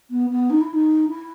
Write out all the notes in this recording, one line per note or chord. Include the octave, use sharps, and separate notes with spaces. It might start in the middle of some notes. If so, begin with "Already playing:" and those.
B3
B3
D#4
E4
D#4
E4